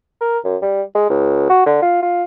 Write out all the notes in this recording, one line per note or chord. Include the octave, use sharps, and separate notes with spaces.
A#4
F#2
G3
G#3
C#2
F#4
D3
F4
F4